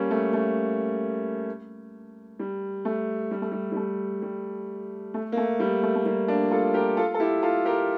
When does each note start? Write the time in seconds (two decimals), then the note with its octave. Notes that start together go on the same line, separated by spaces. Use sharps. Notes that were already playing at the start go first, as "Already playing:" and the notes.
Already playing: G3 A#3 C#4
0.11 A3
0.33 A3
2.39 G3
2.85 A3
3.31 G3
3.42 A3
3.52 G3
3.72 G3
3.76 A3
4.22 G3
5.14 A3
5.32 A#3
5.37 A3
5.60 G3
5.83 A3
5.95 A3
6.06 G3 A#3
6.28 A#3 D4
6.51 F4 A4
6.74 G4 A#4
6.97 F4 A4
7.14 A4
7.20 E4 G4
7.43 F4 A4
7.65 G4 A#4